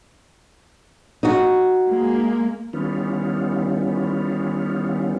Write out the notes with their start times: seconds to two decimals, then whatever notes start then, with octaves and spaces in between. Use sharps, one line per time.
1.23 D#4 F#4
1.88 G#3 A#3
2.73 D#3 E3 G3 B3 C#4 F4